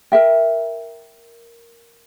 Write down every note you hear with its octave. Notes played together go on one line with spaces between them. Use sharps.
A#4 E5 G5